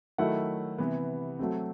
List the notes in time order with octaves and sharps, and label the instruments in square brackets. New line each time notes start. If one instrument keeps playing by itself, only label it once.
[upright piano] D#3 F#3 A3 E4 F#5
C3 E3 B3
F#3 A3 C4